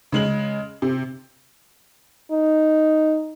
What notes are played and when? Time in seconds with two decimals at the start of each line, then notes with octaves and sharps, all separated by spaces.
0.12 C#3 G#3 F#7
0.82 C3
2.31 D#4